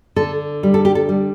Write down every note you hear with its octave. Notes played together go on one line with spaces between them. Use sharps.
D3 A4
G3
A4
G4
A4
G3